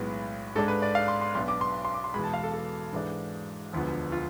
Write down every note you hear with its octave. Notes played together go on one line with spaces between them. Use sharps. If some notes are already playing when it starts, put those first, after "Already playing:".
Already playing: B1 A2 G#3 B3
G#2 G#3 D4 A4
B4
D5
F5
C6
C6
B1 B2 B3 D4 C6
D6
C6
C6
D6
C6
E2 B2 G#3 B5
A5
F5
A4
A4
G#2 E3 G#3 D4
E1 D2 D3 F3 B3
F4